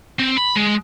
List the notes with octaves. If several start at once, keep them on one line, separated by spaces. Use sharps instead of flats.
C4
B5
G#3